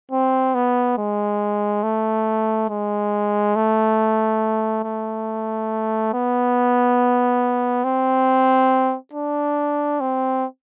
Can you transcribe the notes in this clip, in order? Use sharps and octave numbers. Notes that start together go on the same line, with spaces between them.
C4
B3
G#3
A3
G#3
A3
A3
B3
C4
D4
C4